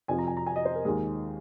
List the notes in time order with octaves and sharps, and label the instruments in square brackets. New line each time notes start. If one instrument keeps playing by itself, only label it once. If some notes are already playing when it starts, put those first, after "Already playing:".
[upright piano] F2 C3 F3 G#5
A#5
G#5
A#5
G#5
D#5
C5
A#4
D#2 D#3 G#3 G#4